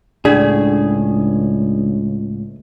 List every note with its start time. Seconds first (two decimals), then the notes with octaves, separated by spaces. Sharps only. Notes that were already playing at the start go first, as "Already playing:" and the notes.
0.25 C#2 A2 D4 G#4 D5